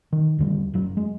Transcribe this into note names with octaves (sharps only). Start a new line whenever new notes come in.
D#3
D#2 D3 G3
F#1 F#3
G#3